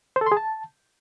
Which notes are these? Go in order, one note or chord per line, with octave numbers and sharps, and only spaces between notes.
C5
A4
C6
G#4
A5